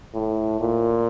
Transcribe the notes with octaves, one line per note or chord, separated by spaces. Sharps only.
A2
A#2